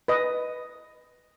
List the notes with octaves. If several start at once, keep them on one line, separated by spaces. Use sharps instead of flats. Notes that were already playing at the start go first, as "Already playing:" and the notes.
B4 D#5